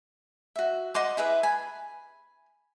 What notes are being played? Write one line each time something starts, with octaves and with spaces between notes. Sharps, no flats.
F#4 E5
D#5 F#5 C6 D6
E4 G#4 B4 E5
G#5 B5